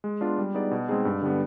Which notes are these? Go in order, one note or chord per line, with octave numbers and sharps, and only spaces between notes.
G#3
B3 D4 F4
G3
B3 D#4 G#4 D5
B2
G#3 C4 D#4 G#4
G2
D3 G3 B3